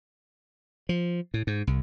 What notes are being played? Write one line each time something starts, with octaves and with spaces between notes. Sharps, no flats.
F3
A2
G#2
C2